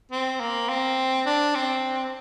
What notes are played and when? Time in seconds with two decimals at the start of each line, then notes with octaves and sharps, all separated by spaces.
0.11 C4
0.40 A#3
0.69 C4
1.26 D4
1.55 C4